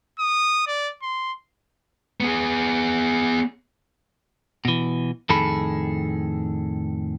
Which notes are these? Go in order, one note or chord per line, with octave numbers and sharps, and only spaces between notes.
D#6
D5
C6
B3 G#4
B2 E3
F2 A2 D#3 G#4 A4 B5